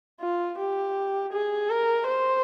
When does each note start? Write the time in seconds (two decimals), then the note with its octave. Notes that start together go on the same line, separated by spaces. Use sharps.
0.21 F4
0.58 G4
1.33 G#4
1.70 A#4
2.07 C5